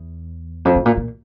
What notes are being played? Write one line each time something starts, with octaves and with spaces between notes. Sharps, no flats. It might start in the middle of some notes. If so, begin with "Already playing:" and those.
Already playing: E2
F2
A2
A#2
A#2